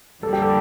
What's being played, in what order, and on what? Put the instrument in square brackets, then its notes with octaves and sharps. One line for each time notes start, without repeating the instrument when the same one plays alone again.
[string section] F2 D3 G3 A#3 [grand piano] A4
[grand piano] G4
A4